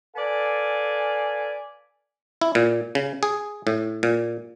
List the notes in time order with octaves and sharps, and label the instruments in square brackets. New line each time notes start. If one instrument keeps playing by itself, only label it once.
[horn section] A4 B4 D5 F5 G#5
[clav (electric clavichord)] E4
A#2
C#3
G#4
A2
A#2